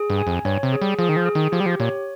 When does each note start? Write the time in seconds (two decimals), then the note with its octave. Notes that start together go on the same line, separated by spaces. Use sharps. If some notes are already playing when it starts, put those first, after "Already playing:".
Already playing: G#4
0.10 G2
0.18 G#5
0.27 F2
0.45 G2 C#5
0.63 C3
0.72 G#4
0.82 G3
0.99 F3 G#4
1.09 D#3
1.16 F3
1.26 G#4
1.35 D#3
1.52 F3 G4
1.60 G3
1.66 F3
1.80 A#2 C#5